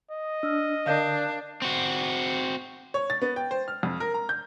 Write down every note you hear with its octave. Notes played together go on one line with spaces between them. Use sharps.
D#5
D4 E6 F6
D3 D4 A#4 F5 G6
C4 F#4
C#5
A6
B3
G5
C5
F6
F2
A#4
A#5
G6